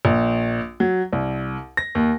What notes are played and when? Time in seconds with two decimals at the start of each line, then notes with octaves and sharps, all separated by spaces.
0.05 A#1
0.80 F#3
1.13 C2
1.77 A#6
1.95 D#2